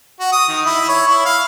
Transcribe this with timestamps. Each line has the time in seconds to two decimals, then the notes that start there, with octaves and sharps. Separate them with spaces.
0.20 F#4
0.32 D#6
0.48 D#3
0.66 E4
0.89 C#5
1.08 E4
1.25 F5